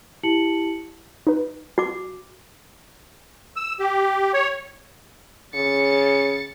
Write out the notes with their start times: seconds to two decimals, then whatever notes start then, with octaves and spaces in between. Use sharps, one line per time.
0.23 E4 G4 A5 C#7 F#7
1.27 D#4 B4
1.78 F#4 D6
3.56 E6
3.80 G4
4.33 C#5
5.55 C#3 A6 C#7